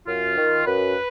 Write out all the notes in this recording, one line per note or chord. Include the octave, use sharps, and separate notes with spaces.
F#2 F4
D#3
F#2 B4